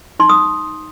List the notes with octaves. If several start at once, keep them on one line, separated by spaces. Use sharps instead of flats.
D#4 C6
D#6